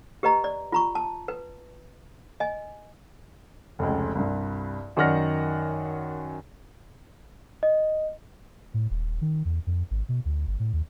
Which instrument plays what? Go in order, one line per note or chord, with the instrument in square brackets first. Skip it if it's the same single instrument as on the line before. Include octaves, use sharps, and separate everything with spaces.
[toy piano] G4 B4 D#5 A#5
D5
F4 A#5 C#6
A5
B4
D#5 G#5
[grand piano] F1 C#2
C2 G2
F#2 D#3 D5 F#5 F6 A#6
[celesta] D#5
[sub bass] A2
D#1
D#3
E2
F2
G#1
B2
D2
G1
A2
D#2